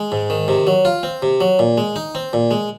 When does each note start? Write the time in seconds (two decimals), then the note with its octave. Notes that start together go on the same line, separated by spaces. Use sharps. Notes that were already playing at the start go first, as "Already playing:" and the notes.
Already playing: G#3
0.12 G#2
0.30 D#3
0.48 C3
0.67 F#3
0.85 F4
1.03 C4
1.22 C3
1.41 F#3
1.59 A#2
1.78 G#3
1.96 D#4
2.15 C4
2.33 A#2
2.51 G#3